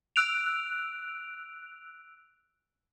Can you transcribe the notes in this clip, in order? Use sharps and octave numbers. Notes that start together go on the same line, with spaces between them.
E6 F#6 D7 F7